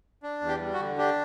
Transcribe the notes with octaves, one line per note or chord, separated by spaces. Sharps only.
D4
E2
G4
G3
F#4
D3
D4 G4